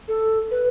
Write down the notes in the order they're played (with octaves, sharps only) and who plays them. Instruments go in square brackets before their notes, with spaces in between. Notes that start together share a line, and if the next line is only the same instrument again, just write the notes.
[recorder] A4
B4